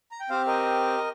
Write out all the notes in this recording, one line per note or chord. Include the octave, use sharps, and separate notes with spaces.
A#5
G5
C4 G4 C5 F5
A#4 D#5